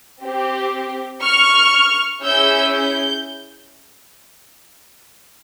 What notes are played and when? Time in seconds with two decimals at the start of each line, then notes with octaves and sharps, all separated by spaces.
0.22 C4 G4
1.22 C#6 F6
2.23 C#4 E4 G#4 E6 G6
2.73 G6